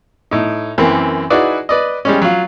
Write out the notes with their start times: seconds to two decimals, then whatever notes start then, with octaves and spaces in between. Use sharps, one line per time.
0.31 A2 D#4
0.78 F#2 E3 A#3 C4
1.30 D#4 E4 F#4 G#4 B4 D5
1.69 B4 D5 D#5
2.05 G3 G#3 C#4
2.22 F#3 F4